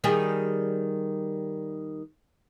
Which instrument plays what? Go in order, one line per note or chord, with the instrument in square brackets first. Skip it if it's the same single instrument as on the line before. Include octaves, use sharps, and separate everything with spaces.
[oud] D#3 G3 G#4